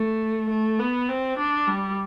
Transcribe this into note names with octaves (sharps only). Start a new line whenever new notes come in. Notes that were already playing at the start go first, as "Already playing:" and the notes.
Already playing: A3
A3
B3
C4
D4
G3